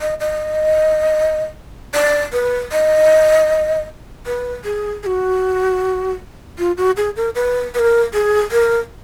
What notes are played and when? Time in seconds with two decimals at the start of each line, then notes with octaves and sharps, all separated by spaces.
0.01 D#5
0.20 D#5
1.94 D5
2.33 B4
2.72 D#5
4.26 B4
4.65 G#4
5.03 G#4
5.06 F#4
6.59 F4
6.78 F#4
6.97 G#4
7.16 A#4
7.35 B4
7.74 B4
7.79 A#4
8.13 G#4
8.52 A#4